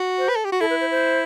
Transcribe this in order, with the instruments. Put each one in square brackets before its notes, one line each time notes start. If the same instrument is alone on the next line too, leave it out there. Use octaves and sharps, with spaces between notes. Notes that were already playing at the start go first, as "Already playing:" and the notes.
Already playing: [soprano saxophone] F#4
[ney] C5
[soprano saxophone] B4
A4
G4
F#4
[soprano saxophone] E4 [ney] A4
[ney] B4
C5
C5